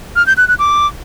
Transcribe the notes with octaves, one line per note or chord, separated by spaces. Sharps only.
F6
G6
F#6
F#6
D6